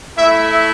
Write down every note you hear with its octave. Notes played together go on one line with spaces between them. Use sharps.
A3 E4 E5